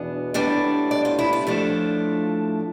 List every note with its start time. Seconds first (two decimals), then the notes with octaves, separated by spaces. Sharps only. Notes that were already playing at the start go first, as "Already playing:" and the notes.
Already playing: E2 B2 B3 D4
0.34 A2 G3 B3 D4
0.91 D5
1.05 F4
1.19 E4
1.33 F4
1.47 A2 F3 A3 D4